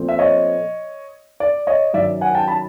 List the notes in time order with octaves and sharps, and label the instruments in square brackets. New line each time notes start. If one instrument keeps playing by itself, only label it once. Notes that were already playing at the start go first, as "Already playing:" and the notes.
Already playing: [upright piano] A#2 F3 A3 C4
E5
C#5 D#5
D5
C#5 D#5
F#2 D#3 F#3 D5 E5
F#5 G#5
G5 A5
A5 B5